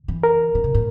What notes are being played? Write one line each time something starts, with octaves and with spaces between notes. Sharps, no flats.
E3
A#4
D3
C#3
A2